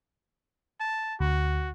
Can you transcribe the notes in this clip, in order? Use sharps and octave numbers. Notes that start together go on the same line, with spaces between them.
A5
D2 F#4